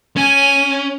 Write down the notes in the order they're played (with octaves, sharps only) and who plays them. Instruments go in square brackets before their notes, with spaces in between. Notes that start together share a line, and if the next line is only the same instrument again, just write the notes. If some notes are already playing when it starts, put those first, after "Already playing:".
[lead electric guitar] C#4 [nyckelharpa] G#5